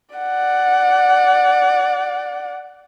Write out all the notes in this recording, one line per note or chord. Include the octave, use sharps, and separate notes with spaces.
D5 F#5